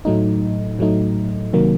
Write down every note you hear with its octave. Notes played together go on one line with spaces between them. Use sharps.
A2 F#3 A3 D#4
A2 F#3 A3 D#4
C3 D#3 F#3 A#3